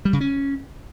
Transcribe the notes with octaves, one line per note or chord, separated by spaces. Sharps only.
G3
C#3
C#4